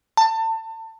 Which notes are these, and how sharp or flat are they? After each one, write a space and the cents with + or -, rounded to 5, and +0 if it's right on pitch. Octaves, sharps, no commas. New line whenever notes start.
A5 +30